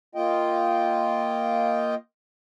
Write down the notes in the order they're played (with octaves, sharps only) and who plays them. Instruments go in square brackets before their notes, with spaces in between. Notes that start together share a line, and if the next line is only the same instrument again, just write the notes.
[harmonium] A#3 F4 D#5 G5